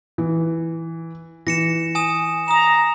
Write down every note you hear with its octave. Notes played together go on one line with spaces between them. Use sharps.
E3
E3 A#6 C#7 E7
G#5 D#6 E7
A#5 D#6 E7